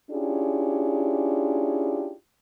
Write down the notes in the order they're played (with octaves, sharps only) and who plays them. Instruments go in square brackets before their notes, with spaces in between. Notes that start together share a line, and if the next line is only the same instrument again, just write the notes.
[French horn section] C#4 D4 E4 F4 G4 G#4